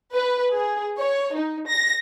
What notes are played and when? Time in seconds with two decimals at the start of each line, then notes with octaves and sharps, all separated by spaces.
0.15 B4
0.55 G#4
0.99 C#5
1.34 D#4
1.68 A#6